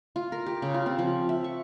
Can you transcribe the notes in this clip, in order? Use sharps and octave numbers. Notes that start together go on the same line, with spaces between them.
F4
A#4
G4
C#3
F4
C4
F3
E5
C#6